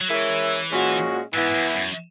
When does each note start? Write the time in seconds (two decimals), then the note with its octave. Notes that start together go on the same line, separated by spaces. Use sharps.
0.01 F#3
0.09 E3 G#3 C#4 E4 A#4 C#5
0.71 A#2 G#3 C#4 F#4
1.34 G#2 E3 B3 E4
1.55 F#2
1.68 E2
1.75 F#2